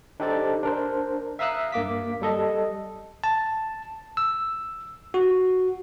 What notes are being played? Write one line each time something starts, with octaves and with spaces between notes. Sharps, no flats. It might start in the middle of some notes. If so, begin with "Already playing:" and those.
D4 D#4 G4 A4 C5 D5
D4 A#4 C5
E5 F5 A#5 D#6 E6 F#6
G2 A#3 D6 B6
G3 A4 D#5
A5
E6
F#4